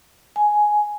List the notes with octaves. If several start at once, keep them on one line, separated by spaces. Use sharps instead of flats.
G#5